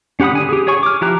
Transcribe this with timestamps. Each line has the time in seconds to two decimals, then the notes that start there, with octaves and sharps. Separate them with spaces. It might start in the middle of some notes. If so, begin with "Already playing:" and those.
0.20 C#4 G4 F#5 B5 D#6
0.33 D3 G#5
0.49 G4 G#4
0.67 G#4 C#5 G#5 C#6
0.83 D6 F6
1.01 F3 E4 G4 A#5 F#6